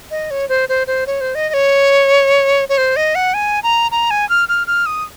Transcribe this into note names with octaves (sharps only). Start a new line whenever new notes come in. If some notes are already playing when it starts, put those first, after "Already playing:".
D#5
C#5
C5
C5
C5
C#5
C5
D#5
D#5
C#5
C#5
C5
D#5
F#5
G#5
A#5
A#5
G#5
F6
F6
F6
D#6